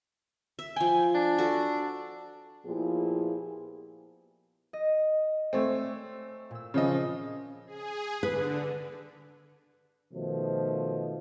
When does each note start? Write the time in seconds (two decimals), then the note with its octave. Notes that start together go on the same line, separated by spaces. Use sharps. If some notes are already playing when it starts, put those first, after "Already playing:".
0.59 E5
0.76 F3 G5 G#5
1.14 D4
1.38 F#4 A4
2.66 A#2 F3 B3 E4 G4 G#4
4.73 D#5
5.53 A3 C4 C#5 D5 G#5
6.51 A#2 E6
6.74 C#3 F3 D#5
7.66 G#4
8.23 D3 B4
10.13 B2 D#3 F3 A3